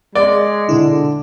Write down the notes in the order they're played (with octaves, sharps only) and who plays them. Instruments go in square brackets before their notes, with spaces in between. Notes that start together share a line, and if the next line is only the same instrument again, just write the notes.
[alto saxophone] G#3 [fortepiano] D5
[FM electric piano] B2 D4 E4 [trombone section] D3